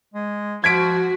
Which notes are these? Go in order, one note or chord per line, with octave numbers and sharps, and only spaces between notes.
G#3
F3 F#4 G#6 B6 D7